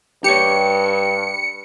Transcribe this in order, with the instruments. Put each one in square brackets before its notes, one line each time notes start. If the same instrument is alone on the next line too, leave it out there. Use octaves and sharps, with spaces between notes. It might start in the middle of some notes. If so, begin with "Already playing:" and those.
[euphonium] G2 [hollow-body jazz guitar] G4 C#5 [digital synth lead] C#7